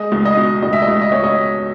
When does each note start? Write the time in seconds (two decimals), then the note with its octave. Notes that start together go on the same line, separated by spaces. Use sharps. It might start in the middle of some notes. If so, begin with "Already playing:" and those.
Already playing: G#3 D#5
0.12 C#2
0.25 D#5
0.37 B2
0.63 C#2 D#5
0.73 E5
0.82 D#5
0.88 C#2
1.02 D#5
1.12 C#2 C#5
1.24 D#5